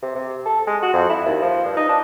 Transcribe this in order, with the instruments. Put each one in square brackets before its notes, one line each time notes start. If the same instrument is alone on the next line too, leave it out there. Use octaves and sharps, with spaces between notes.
[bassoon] C3
C3
A4
G#3
F#4
F2
E4
D#2
F3
G2
D#4
D4